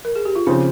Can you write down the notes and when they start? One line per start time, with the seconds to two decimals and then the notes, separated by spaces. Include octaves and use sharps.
0.05 A#4
0.16 G#4
0.25 G4
0.36 F4
0.46 C#3 F3 C4 D#4